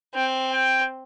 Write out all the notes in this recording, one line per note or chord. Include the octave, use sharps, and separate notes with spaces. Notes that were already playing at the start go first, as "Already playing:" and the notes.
C4 G5
G5